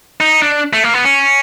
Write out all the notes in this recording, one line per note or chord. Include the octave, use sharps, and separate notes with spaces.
D#4
D4
A3
A#3
B3
C#4